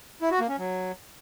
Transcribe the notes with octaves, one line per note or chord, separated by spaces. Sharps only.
E4
F#4
A#3
C#4
F#3